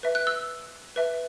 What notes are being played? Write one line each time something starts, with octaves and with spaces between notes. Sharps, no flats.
B4 E5
F#6
E6
B4 E5